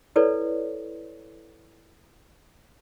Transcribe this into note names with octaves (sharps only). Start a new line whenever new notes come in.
E4 A4 B4 C#5 D5